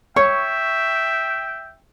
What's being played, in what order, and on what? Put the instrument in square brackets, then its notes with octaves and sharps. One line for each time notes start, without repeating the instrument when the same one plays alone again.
[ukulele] C#5 [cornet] E5 [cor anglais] G5 [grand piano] C#6